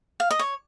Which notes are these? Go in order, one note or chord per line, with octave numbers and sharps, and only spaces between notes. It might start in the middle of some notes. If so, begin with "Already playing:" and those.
F5
D#5
C#5